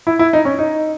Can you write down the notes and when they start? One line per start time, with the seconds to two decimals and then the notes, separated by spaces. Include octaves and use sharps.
0.07 E4
0.19 E4
0.33 D#4
0.45 C#4
0.59 D#4